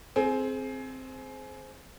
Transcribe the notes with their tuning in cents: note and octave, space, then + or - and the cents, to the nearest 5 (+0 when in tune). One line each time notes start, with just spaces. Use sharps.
C4 +0 G#4 +25